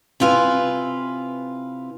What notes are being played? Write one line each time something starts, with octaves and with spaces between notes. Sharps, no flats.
C3 E4 F4 B4 G#5